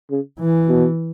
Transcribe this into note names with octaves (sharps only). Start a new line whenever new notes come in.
C#3
E3
B2